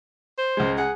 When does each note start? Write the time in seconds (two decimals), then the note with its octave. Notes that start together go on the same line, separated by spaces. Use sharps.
0.38 C5
0.57 C#2 G#3
0.78 G#4 F#5